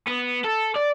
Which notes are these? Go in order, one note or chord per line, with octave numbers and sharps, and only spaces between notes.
B3
A4
D5